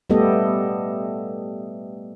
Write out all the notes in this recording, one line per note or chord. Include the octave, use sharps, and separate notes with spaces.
G3 A3 B3 G4 A4 D#5